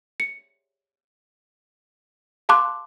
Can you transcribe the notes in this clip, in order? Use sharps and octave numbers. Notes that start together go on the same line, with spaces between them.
C#7
F5 A5 C6 D6 F#6